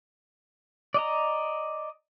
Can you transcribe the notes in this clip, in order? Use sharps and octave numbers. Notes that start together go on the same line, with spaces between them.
D5 D#5 A#5